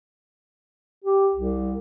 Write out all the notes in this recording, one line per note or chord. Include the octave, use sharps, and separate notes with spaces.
G4
C2